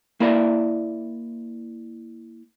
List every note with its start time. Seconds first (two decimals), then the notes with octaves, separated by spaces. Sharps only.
0.20 A#3 E4 A#4 D5 E5